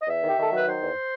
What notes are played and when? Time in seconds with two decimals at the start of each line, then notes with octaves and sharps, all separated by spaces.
0.02 D#5
0.07 E2 E5
0.22 D#3
0.29 G4
0.37 D#3 A4
0.52 F#3 B4
0.66 D#3 C5
0.82 E2